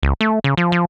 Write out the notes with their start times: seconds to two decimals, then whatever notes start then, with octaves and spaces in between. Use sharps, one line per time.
0.03 C#2
0.21 A3
0.44 C#3
0.57 F3
0.72 F3